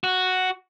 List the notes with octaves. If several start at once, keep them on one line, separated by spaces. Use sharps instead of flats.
F#4